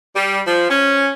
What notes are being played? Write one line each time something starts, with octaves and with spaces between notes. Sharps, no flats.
G3
F3
C#4